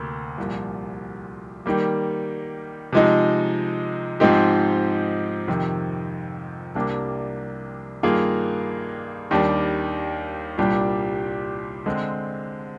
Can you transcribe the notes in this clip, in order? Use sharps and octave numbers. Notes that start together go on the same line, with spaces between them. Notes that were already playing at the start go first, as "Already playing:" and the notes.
Already playing: D2 C3 A#3
C2 A#2 F3
D#3 G3 A#3
C3 F3 G#3 D#4
G#2 F3 C4 D#4 G4
F2 C3 D#3
C2 C3 G3 A#3 D4
G2 D#3 A#3 F4 G#4
D#2 D#3 G3 D4
C2 A#2 G3 D4 G4
D3 G#3 C4